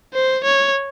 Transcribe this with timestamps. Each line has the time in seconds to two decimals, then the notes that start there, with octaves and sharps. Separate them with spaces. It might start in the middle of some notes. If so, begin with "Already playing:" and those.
0.14 C5
0.44 C#5